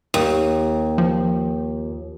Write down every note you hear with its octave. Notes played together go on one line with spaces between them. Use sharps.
D#2
F3